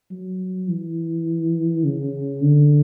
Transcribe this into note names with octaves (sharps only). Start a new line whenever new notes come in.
F#3
E3
C#3
D3